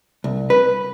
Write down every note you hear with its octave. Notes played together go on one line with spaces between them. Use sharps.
C2
B4